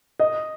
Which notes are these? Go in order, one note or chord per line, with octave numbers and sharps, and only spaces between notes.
D#5